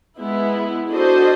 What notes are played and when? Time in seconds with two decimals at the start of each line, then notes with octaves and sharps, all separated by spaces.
0.19 G#3 B3 E4
0.90 D4 F#4 A4 C5 D#5